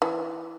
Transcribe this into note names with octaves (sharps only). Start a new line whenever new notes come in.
E3